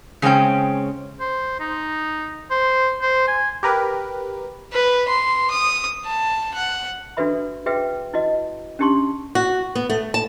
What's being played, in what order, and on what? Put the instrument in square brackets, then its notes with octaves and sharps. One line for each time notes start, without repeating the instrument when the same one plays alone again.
[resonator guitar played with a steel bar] C#3 G#3 C4 C#4 G5
[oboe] C5
D#4
C5
C5
G#5
[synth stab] G4 A#4 B4
[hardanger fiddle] B4
C6
D#6
A5
F#5
[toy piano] D4 F#4 A4 B4 E5 B5
F#4 G#4 B4 E5 G5
E4 F#4 D#5
C#4 D4 G4 A5 C6 C#6
[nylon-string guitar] F#4
B3
A3
A5